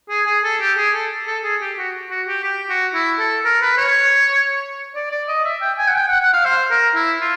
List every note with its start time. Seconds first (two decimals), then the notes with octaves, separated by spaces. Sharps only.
0.10 G#4
0.26 G#4
0.44 A4
0.60 G4
0.77 G#4
0.94 A4
1.27 A4
1.44 G#4
1.61 G4
1.78 F#4
2.10 F#4
2.28 G4
2.44 G4
2.69 F#4
2.94 E4
3.19 A4
3.45 A#4
3.62 B4
3.77 C#5
4.95 D5
5.11 D5
5.28 D#5
5.45 E5
5.61 G5
5.78 G#5
5.88 F#5
5.95 G5
6.08 F#5
6.20 F#5
6.33 F5
6.45 C5
6.71 A#4
6.95 E4
7.21 F4